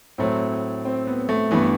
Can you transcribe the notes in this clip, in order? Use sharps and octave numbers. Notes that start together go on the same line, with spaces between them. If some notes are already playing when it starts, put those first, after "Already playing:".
A2 F#3 A3 C4
C4
B3
A3
G2 E3 A3 B3